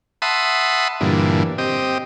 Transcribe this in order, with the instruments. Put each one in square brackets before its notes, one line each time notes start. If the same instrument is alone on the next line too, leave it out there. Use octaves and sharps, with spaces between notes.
[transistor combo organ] E5 F#5 A5 B5 C6 D#6
G2 A#2 D3 E3
C4 G4 D#5